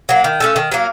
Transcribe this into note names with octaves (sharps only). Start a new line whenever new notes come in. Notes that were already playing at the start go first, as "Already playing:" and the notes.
F#3 A#3
D#3
A3 C#4 A4
D#3
F#3 A#3